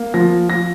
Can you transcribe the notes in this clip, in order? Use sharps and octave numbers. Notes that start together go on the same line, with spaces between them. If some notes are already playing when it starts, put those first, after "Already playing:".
Already playing: A#3
F3 A#6
F3 A#6